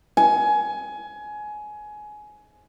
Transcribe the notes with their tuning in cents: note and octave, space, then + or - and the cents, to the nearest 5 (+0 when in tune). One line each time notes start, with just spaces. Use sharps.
G#5 +20